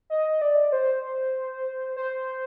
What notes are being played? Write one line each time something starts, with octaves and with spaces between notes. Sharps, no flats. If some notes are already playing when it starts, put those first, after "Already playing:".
D#5
D5
C5
C5